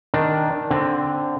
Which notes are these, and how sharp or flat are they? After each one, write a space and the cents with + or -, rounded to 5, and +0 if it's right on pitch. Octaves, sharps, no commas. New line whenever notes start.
D#3 +0 D4 +0
D3 +0 C4 +5